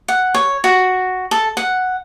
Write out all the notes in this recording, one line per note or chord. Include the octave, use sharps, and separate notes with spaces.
F#5
C#5
F#4
A4
F#5